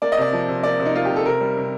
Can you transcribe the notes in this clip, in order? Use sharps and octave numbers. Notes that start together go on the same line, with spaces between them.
A#3 D5
D#5
C3 D5
F3
C3
A#3 D5
C3
D#4
A#3 F4
G4
C3
A4
C3 A#4
G3
C3